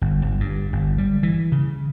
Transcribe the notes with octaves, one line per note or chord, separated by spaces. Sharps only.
G1
G1
G2
G1
G3
E3
C#3